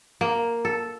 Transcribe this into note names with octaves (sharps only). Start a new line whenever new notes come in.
A#3
A4